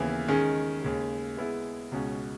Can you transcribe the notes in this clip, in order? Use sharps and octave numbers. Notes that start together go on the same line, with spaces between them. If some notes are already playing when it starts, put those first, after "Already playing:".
Already playing: D#2 C#3 E3 B3
D#3 G#3 C#4 G#4
D#2 C#3 G#3
G#3 B3 E4 G#4
C#2 B2 G#3 C#4